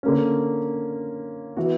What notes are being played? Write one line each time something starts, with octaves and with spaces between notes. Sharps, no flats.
D3 A#3 C#4
E3 B3 F#4